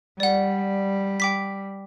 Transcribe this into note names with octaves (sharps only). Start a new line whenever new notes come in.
G3 D5 F#5
G5 D6 B6